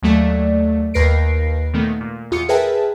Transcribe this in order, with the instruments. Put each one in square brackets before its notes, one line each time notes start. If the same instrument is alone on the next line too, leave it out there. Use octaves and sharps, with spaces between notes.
[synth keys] D#2 F#3 A3 D5
D#2 A#4 B4 A#6 C7 D7
A#2 D#3 A3 B3
A#2
E2 F4 D#6 C#7
G#4 A#4 B4 E5 G5 A5